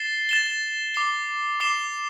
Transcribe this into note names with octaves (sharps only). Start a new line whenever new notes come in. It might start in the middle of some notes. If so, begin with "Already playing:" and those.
Already playing: A6 C7 E7 G7
A6 E7 G7
D6 C7 G7
D6 C7 E7 G7